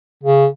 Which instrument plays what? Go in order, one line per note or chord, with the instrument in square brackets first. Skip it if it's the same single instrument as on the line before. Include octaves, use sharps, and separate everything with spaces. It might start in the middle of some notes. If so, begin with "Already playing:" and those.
[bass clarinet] C#3